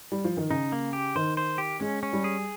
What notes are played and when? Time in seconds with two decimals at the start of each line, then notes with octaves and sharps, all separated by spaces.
0.12 G3
0.24 F3
0.37 D#3
0.50 C#3 D#4
0.72 A#3
0.93 G4
1.15 D#3 C5
1.37 C5
1.58 G4
1.80 G#3 C#4
2.03 C#4
2.13 G3
2.24 G#4